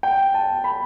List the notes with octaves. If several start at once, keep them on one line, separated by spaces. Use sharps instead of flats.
G5
A5
B5